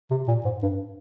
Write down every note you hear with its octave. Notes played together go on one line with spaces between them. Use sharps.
C3
A#2
G#2
G2